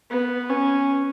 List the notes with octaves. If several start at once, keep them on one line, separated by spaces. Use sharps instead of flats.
B3
C#4